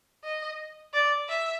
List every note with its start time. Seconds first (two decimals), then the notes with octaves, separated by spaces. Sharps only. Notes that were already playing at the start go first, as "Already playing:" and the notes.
0.24 D#5
0.93 D5
1.29 E5